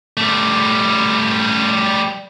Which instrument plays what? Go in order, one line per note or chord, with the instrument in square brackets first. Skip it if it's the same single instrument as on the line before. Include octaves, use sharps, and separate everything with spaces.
[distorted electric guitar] G3 A3